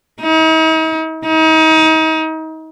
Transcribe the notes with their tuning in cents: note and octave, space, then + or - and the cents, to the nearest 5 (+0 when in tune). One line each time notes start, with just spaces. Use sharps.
D#4 +45
D#4 +35